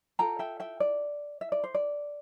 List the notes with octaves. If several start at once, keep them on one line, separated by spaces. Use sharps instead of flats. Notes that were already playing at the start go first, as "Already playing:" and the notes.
F4 A4 G5 A#5
E5 G5
E5 G5
D5
E5
D5
C5
D5